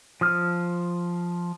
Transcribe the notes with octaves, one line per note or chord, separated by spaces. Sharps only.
F3 D#6 F6